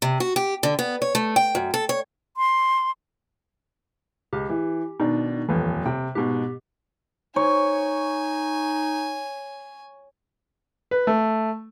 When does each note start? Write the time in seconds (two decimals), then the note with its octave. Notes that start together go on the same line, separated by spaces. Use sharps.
0.02 C3
0.20 F#4
0.36 G4
0.63 D3
0.79 B3
1.02 C#5
1.15 A3
1.36 G5
1.55 F#2
1.74 A4
1.89 C#5
2.37 C6
4.33 C#2 G4
4.49 E3
5.00 B2 D#3 D4 D#4
5.49 D#1 F2 E3
5.86 C3 G5
6.15 G#2 B2 G4
7.36 D#4 C#5 G#5
10.91 B4
11.07 A3